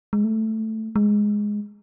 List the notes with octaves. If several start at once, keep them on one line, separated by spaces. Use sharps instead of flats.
G#3
A3
G#3